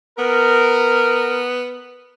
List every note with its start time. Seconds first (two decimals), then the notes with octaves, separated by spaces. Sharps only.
0.19 B3 A#4